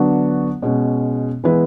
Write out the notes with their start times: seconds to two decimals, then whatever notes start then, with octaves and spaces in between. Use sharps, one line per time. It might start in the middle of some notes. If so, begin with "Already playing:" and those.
Already playing: D3 F#3 B3 D4 F#4
0.62 B2 G#3 C#4
1.44 E3 G#3 B3 E4 B4